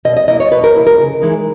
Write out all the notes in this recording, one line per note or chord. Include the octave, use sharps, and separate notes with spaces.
B2 D#5
D#5
A#3 E4 D#5
C#5
B2 B4
A#4
A#3 E4
A#4
C#3
E3 G#3 D#4